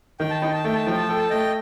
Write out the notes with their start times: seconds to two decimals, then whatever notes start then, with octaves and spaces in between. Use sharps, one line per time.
0.20 D#3 G5
0.31 A5
0.41 D#4 G5
0.53 A5
0.64 A3 G5
0.75 A5
0.86 F3 G5
0.97 A5
1.08 A4 G5
1.18 A5
1.30 A3 D#5 G5